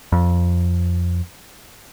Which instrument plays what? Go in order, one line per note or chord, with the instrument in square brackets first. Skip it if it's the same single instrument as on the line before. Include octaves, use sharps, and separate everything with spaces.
[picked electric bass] F2